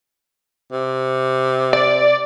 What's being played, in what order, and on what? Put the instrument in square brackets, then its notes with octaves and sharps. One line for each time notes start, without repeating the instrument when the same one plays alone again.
[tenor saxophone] C3
[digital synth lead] D5